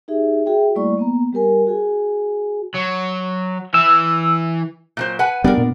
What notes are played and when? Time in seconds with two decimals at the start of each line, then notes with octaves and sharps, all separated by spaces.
0.08 D#4 G4 G#4 E5
0.46 F#4 G#4 E5 G5
0.75 G3 A3 A#3 E4 D5 C#6
0.98 A#3 B3 A#5
1.33 G3 G4 A#4 G#5
1.67 F#4 G#4 G#5
2.75 F#3
3.74 E3 E6
4.97 A#2 F#3 C5
5.19 B4 F#5 G#5
5.44 G3 B3 D4 A#4 D5
5.58 A#2